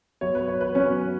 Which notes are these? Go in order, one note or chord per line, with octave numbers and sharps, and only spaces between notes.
F#3 B3 F#4 C#5
B4
C#5
B4
F#3 B3 C#4 F#4